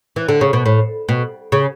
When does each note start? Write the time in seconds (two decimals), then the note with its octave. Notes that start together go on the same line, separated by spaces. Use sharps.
0.16 E3
0.29 D3
0.41 C#3
0.53 B2
0.66 A2
1.09 B2
1.52 C#3